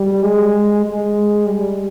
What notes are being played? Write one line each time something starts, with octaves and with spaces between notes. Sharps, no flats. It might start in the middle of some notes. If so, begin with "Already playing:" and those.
Already playing: G3
G#3
G#3
G3